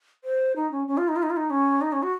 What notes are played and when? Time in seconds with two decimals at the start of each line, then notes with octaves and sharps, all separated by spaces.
0.24 C5
0.56 D#4
0.72 C#4
0.88 C#4
0.98 F4
1.08 D#4
1.16 F4
1.23 D#4
1.30 F4
1.37 D#4
1.50 C#4
1.81 D#4
1.92 C#4
2.03 F#4